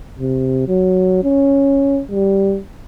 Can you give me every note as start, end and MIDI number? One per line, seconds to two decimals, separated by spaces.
0.19 0.66 48
0.68 1.23 54
1.24 2.01 61
2.11 2.58 55